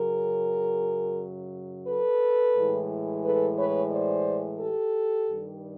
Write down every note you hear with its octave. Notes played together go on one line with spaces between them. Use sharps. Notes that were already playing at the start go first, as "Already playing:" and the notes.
Already playing: F#2 C#3 F#3 G#4 A#4
A4 B4
A2 E3 G#3
A4 B4
B4 C#5
C5 D5
G4 A4
G2 D#3 G3